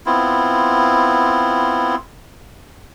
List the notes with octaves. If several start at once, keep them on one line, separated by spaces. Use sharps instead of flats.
B3 C4 E4 F4